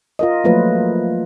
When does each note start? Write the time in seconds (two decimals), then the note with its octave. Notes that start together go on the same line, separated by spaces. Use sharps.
0.19 F4 A#4 D#5
0.44 F3 F#3 A3 A#3 F4 B4